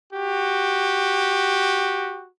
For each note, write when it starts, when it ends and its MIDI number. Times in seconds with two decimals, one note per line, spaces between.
0.13 2.27 66
0.13 2.27 67